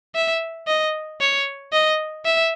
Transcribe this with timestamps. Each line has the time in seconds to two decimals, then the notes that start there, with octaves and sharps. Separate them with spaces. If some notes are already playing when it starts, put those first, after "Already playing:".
0.15 E5
0.67 D#5
1.21 C#5
1.73 D#5
2.25 E5